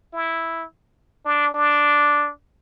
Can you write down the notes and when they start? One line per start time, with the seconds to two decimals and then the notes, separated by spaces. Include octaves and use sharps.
0.13 E4
1.25 D4
1.54 D4